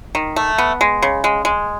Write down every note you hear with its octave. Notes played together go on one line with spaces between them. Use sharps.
D#3
A3
B3
G#3
C#3
G#3
G#3